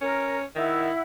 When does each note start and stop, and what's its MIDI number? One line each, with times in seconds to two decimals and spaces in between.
0.01 0.45 61
0.01 0.37 70
0.55 0.90 51
0.55 1.01 64
0.55 1.01 78